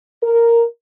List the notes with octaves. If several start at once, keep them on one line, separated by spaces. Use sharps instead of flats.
A#4